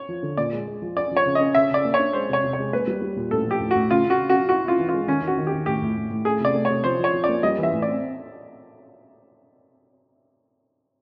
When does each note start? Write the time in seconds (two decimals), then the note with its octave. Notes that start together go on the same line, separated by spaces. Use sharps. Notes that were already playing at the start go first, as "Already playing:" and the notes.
Already playing: C#5
0.09 F3
0.23 D3
0.37 A#2 D5
0.53 G#3
0.67 G#3
0.82 F3
0.97 C#4 D5
1.11 F3
1.17 C#5
1.26 C#3
1.35 C#4 D#5
1.55 C#3 E5
1.70 C#3 D5
1.84 A#3
1.94 C#5
1.99 D4
2.13 G#3 C5
2.29 C3 C#5
2.44 C3
2.53 C#5
2.59 G#3
2.73 A#3 B4
2.87 G3
3.02 G3
3.17 A#2
3.31 A2 A4
3.47 F3 G4
3.60 A2
3.71 A2 F#4
3.90 C#3 F4
4.05 C#3
4.10 F#4
4.20 C#3
4.29 F#3 F#4
4.49 E4 F#4
4.64 E4 F4
4.78 E3
4.89 F4
4.94 G#3
5.07 D#3 C#4
5.22 D#3
5.27 F#4
5.38 D#3
5.47 G4
5.52 D#3
5.66 A2 G4
5.82 A2
5.97 A2
6.11 A2
6.25 A3 G#4
6.40 C3 D5
6.54 A3
6.65 C#5
6.70 C3
6.84 F3 C5
6.99 F3
7.04 C#5
7.13 F3
7.24 A#3 D5
7.43 G3 D#5
7.58 E3
7.63 E5
7.72 A2
7.82 D5
7.88 C4